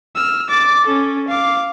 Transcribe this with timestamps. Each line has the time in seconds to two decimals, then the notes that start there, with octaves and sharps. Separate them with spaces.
0.16 E6 F6
0.49 D6 A6
0.86 C#4 A4
1.28 F5 D6